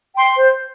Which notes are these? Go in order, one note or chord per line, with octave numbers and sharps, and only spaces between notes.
G5 C6
C5